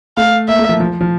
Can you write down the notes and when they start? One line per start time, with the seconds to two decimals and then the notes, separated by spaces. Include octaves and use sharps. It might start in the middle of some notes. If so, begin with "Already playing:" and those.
0.17 A3 F5
0.48 A#3 E5
0.59 A3
0.69 F3
0.80 F3
1.01 F3